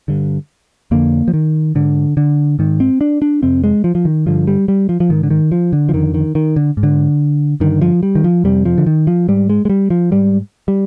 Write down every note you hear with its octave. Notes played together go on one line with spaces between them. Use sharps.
G2 D3
F2 D3 A#3
F3
D#3
G#2 D3
D3
G#2 D#3
C4
D4
D4
F2 C3 C4
G#3
F3
F3
D#3
G2 D3 F3
G3
G3
F3
F3
G#2 D#3
D3
D#3
F3
D3
F3
F2 D3 D#3
D#3
D#3
D3
G#2
D3
G2 D3 D#3
F3
G3
D#3
F3
F2 C3 G3
F3
D3
D#3
F3
G#2 G3
G#3
G#3
G3
F3
G#2 G3
G3